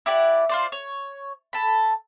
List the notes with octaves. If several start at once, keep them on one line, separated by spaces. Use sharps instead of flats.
E4 G4 D5 F#5
F4 C5 D5
C#5
A4 B5